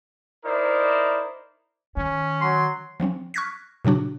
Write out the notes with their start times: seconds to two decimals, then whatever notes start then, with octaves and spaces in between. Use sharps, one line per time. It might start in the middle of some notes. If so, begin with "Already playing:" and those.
0.45 D#4 E4 A#4 C5 D5
1.97 D#3 C#4
2.41 F#3 C6
3.00 F3 F#3 C4 C#4
3.34 C#6 F6 F#6 G#6 A#6 B6
3.85 A#2 C#3 F#3 D4 F#4